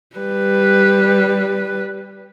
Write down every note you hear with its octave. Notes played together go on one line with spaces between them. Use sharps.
G3 B4